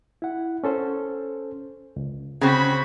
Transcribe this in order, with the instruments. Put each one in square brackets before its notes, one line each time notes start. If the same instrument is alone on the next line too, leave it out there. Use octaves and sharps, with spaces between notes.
[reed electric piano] E4 F#5
C#4 A4 C5
C#2
[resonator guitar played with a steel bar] C#3 C4 [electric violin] F#4 B5